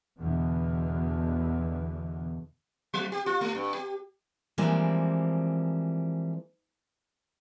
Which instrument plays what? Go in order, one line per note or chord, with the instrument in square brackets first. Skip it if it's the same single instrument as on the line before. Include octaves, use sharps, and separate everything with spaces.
[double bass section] E2 B2 D3
[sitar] F#3
G4
F4
A3
G2
G4
[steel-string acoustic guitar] E3 F3 G3 G#3 A#3 C4